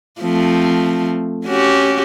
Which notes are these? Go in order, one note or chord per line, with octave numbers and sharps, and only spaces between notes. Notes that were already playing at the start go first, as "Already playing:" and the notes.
F3 A3 C4
C#4 F#4 G4